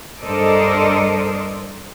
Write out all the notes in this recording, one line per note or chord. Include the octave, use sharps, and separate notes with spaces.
G2 A4 A#4 C5 D5 D#5